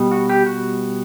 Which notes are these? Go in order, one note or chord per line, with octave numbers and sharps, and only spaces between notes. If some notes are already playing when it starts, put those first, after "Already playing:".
Already playing: B2 G3 B3
F#4
G4
F#4